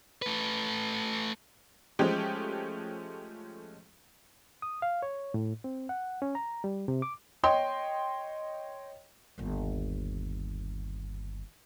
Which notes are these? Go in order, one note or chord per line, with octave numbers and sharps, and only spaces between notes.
A3 B4
F3 G#3 A3 C#4 G4
D#6
F5
C#5
A2
C4
F#5
C#4
A#5
G3
C3
D6
C#5 D#5 G5 C6
G1 D#2